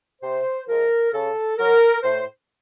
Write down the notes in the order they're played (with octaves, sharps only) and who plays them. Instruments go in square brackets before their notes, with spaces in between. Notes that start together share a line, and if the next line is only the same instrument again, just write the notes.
[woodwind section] C3 C5
F3 G#3 A#4
C#3 A4
F#3 A#4
A2 C5